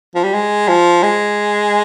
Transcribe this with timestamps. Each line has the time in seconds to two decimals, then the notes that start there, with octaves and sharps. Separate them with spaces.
0.15 F3
0.24 G3
0.34 G#3
0.68 F3
1.03 G#3